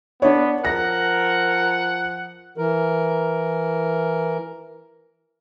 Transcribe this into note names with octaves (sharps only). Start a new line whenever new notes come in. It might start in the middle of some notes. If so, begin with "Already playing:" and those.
B3 D4 C#5
F3 A#4 F#5 A#6
E3 A#4